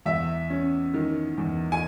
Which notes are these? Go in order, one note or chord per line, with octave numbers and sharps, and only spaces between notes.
E2 E5
C#4
D#3
E2
G#5